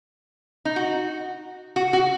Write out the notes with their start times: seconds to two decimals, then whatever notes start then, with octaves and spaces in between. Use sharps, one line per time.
0.65 D#4
0.76 F#4
1.76 F#4
1.93 F#4